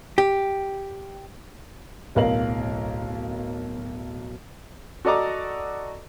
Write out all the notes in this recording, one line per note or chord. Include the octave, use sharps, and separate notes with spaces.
G4
D1 B1 A#4 F5 F#7
F#4 A4 D5 D#5 A#5 D6